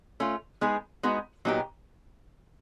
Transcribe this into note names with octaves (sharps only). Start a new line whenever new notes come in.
A3 C#4 F4
G#3 B3 D#4 G#4
G#3 B3 D#4 F#4
A#2 F#3 B3 D#4 G4